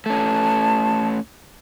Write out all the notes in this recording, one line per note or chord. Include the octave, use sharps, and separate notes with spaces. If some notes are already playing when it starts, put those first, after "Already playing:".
A3 C#4 A5